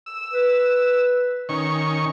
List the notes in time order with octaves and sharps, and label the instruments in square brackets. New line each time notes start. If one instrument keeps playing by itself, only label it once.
[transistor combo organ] E6
[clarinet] B4
[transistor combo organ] D#3 C#4 C#6